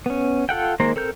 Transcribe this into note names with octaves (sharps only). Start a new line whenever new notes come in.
B3 C#4
F4 A4 F#5 G5
D#3 G#3 A#3 C5 A#5
C4 A4 A#4 G6